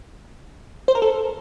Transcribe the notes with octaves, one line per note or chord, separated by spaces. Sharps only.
C5
A#4
A4